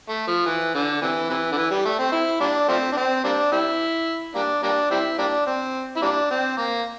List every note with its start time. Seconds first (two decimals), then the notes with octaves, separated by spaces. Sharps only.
0.09 A3
0.28 F3
0.46 E3
0.74 D3
1.02 C3 E3
1.29 C3 E3
1.52 D3
1.57 E3
1.71 G3
1.85 A3
1.99 C4
2.12 E4
2.40 G3 A#3 D4
2.68 F3 A3 C4
2.92 D4
2.97 C4
3.24 G3 A#3 D4
3.52 G3 C4 E4
4.35 G3 A#3 D4
4.63 G3 A#3 D4
4.91 G3 C4 E4
5.18 G3 A#3 D4
5.46 C4
5.96 E4
6.02 G3 A#3 D4
6.30 C4
6.57 A#3